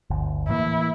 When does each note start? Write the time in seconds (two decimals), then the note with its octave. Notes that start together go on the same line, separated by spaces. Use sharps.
0.10 G1 D2
0.48 A2 E3 A#3 E4